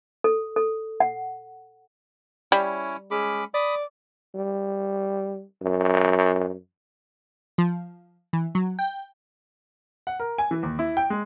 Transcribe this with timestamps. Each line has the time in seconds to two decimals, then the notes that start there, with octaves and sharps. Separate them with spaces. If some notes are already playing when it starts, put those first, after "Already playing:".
0.24 A4
0.56 A4
1.00 F#5
2.52 G3 C#4 E4 C#5
3.11 G#3 C#4 B5 D6
3.54 D5 B5 D#6
4.35 G3
5.62 F#2
7.58 F3
8.33 E3
8.55 F#3
8.79 G5
10.07 F#5
10.20 A#4
10.38 G#5
10.51 E3
10.63 D#2
10.79 E4
10.97 G5
11.10 G#3